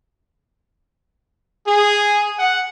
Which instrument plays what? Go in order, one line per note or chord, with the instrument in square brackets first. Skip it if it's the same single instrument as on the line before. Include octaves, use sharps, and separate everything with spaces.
[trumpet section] G#4
F#5